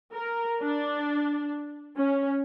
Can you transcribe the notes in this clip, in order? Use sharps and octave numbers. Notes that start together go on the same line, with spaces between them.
A#4
D4
C#4